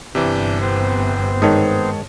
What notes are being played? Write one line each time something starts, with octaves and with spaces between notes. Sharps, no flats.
G1 G2 C3 E3 D4 G6
B3 C4 C5
G#2 D#3 C#5 A5 D#6